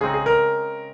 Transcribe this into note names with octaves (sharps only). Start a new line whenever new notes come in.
C#3 G#3 C4 D#4 G#4
G#4
A#4